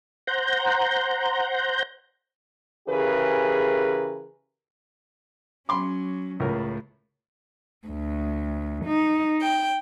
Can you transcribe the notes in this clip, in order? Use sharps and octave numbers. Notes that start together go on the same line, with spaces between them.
C5 F#5 A#5 G6
C#3 E3 G4 G#4 A#4 B4
F#3 C#4 B5 C6 D6
C#2 A2 A#4
D2
D#4
G5